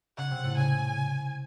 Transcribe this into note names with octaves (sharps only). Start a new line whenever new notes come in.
C#3 C#4 F#5
C3 C4
A2 A3
C#2 C#3 G#5